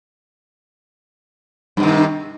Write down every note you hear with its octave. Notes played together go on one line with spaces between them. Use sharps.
G2 C3 D#3